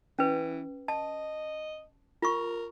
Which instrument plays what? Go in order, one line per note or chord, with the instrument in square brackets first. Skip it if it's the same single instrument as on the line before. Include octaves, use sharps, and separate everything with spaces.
[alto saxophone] E3 [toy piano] C#4 B4
[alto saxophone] D#5 [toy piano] A5
[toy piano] F4 C#6 [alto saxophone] A#4